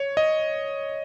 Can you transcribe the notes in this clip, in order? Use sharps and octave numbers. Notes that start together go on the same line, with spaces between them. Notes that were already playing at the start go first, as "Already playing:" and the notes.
Already playing: C#5
D#5